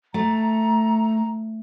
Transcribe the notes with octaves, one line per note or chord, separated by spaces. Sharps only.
A3 A#5